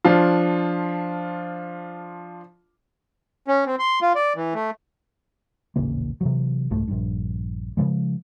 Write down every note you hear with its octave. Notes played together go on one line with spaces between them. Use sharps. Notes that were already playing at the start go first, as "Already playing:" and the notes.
F3 D4 F4
C#4
C4
C6
F4
D5
E3
A3
D#1 A1 C#3 A#3
C3 E3 F#3
F1 C2 G#2 A3
A#1 G2
C#3 E3 F3 G#3